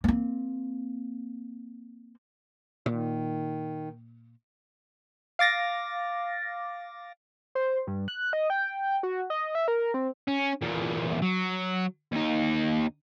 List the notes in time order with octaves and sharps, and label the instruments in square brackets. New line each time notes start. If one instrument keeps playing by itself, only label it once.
[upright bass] A#3 C4
[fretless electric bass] A#2 [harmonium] D#3
[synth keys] F5 D6 A6 A#6
[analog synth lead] C5
G2
F#6
D#5
G5
F#4
D#5
E5
A#4
C4
[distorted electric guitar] C#4
E2 A#2
F#3
D#2 D#4